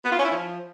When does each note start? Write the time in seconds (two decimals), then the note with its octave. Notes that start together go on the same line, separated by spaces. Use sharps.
0.04 B3
0.11 F4
0.17 C#4
0.24 E4
0.31 F3